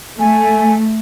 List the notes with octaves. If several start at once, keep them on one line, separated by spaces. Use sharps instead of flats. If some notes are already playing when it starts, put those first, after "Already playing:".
A3 G#5